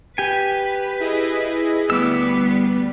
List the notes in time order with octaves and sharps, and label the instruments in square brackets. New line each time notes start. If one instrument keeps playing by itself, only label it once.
[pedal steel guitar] G4 G#5 [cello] B4
[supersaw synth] E4 G#4 D#5
[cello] D2 B3 [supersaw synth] G3 [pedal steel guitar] D6 E6